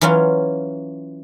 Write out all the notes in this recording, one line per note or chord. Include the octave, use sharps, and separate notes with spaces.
E3 F#3 C#4 F4